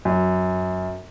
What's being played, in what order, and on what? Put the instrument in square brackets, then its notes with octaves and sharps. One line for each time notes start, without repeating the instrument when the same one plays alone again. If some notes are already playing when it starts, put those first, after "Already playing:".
[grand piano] F#2